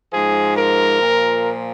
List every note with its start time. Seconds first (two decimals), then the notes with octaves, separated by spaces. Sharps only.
0.12 G#2 F3 G#4
0.58 A#4
1.02 A#2 F3